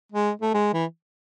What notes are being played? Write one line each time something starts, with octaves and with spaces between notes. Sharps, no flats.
G#3
A3
G#3
E3